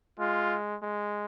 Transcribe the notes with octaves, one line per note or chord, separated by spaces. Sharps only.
G#3 F4
G#3